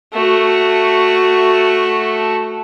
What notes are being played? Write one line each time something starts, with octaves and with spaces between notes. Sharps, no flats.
A3 F#4